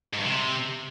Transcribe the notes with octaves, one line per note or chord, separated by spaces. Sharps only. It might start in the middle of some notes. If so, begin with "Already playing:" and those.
G#2
G2
C3